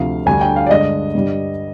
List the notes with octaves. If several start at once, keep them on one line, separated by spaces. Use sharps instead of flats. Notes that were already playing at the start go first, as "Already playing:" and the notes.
Already playing: D2 C3 F3 F5
D2 D3 G3 G#5
G5
F5
D5
G2 D3 G#3 D4 D#5
G2 D3 G3